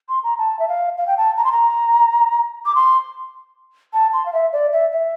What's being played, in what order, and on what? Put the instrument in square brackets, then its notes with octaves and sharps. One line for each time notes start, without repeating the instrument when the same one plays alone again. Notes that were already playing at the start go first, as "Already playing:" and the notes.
[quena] C6
A#5
A5
E5
F5
F5
G5
A5
A#5
C6
A#5
D6
C6
A5
C6
F5
E5
D5
E5
E5